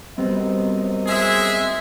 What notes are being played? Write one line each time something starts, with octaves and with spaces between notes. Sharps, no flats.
F#2 G3 B3 C4 C5 D#5
G#3 G#4 E5